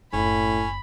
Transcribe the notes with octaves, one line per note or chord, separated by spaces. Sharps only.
F#1 A2 C#4 B5